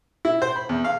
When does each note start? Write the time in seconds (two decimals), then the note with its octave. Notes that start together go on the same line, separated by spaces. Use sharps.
0.25 E4
0.42 C5
0.56 B5
0.69 E2
0.84 F5